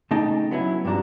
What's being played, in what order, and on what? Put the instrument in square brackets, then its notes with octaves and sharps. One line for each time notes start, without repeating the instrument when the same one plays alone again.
[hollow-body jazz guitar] C#3 A3 D#4 D#5 G5 A5
F#3 B3 C#4 E4
G2 B2 F3 D4 F#4 A#5